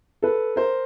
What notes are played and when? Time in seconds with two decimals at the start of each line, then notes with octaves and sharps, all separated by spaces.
0.22 A4 B4
0.56 A#4 C5